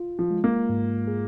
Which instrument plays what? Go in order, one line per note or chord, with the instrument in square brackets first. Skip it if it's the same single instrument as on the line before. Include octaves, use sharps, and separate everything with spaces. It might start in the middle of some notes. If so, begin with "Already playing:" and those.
Already playing: [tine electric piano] F4
[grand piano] F3
[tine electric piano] G#3
[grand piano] A#3
[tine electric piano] G#2
G#4